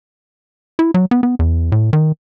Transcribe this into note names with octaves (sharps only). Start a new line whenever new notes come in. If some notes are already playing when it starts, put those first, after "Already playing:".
E4
F#3
B3
B3
E2
A2
D#3